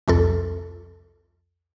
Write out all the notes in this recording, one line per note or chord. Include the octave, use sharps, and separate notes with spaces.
C2 F2 A4